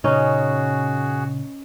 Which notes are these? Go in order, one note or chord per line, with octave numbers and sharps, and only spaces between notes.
A#2 C#3 C#4 D#4 F#4 G#4